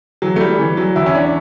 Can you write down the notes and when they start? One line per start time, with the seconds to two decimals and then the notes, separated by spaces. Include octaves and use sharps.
0.22 E3 F#3
0.36 A3
0.40 G3
0.59 E3
0.77 F#3
0.96 E2 E4
1.06 C#4
1.15 D4